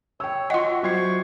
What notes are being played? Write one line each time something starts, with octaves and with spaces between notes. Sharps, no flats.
C#5 G5 E6
F4 F#4 D#5 E5 F#5 C6
F#3 C5 D5 C#6 G#6 C7